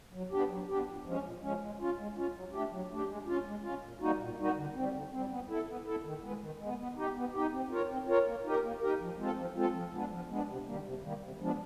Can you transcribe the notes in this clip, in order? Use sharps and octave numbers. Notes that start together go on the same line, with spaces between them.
F#3
B3 D4 G4
F#3
B3 D4 G4
A#2
F3 G#3 C#4
A#2
F3 G#3 C#4
G#3
C#4 F4
G#3
C#4 F4
F#3
A3 D4 G4
F#3
A3 D4 G4
G#3
C#4 F4
G#3
C#4 F4
A#2
G3 A#3 D#4 F#4
A#2
G3 A#3 D#4 F#4
D3
G3 C4
D3
G3 C4
B3
E4 A4
B3
E4 A4
D#3
G#3 B3
D#3
G#3 B3
B3
D#4 G4
B3
D#4 G4
C4
F4 A#4 C#5
C4
F4 A#4 C#5
A#3
D#4 G4 A#4
A#3
D#4 G4 A#4
F3
G#3 C4 F4 A4
F3
G#3 C4 F4 A4
F3
G#3 B3 D4
F3
G#3 B3 D4
C3
D#3 G3 A#3
C3
D#3 G3 A#3
C3
F3 G#3 B3 D4